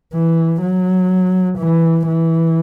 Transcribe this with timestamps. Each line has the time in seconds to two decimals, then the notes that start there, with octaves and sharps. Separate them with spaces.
0.14 E3
0.62 F#3
1.59 E3
2.08 E3